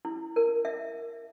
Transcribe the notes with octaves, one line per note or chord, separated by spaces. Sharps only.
E4
A#4
E5